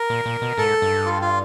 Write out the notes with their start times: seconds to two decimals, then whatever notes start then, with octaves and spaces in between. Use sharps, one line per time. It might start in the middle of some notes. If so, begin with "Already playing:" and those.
Already playing: A#4
0.10 A#2
0.26 A#2
0.42 B2
0.57 G#2 A4
0.82 G2
1.06 F4
1.22 F4